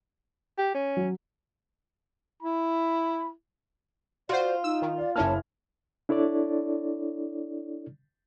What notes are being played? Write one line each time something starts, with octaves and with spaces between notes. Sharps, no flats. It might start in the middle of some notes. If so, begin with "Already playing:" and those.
G4
C#4
F#3
E4 B5
F4 F#4 C5 D5
D#4 E6
D#3
D5 F5
F#1 A#3 C#4 E4 A5 F6
D4 E4 A4 C#5 D5